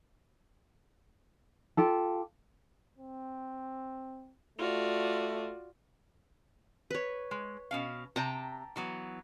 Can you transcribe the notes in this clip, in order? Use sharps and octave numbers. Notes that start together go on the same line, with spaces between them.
F4 G4 A4
C4
A3 F4 F#4 D5
B4 C#5
G#3
B2 C#4 F5
C3 G5 A5 A#5
E3 F#3 B3